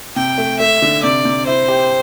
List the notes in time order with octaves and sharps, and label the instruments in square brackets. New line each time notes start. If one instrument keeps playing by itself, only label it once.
[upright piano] C3 [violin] G5
[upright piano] A3
[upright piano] A3 [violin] E5
[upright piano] D3
[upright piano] C3 [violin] D5
[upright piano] C3
[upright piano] E4 [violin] C5
[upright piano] G4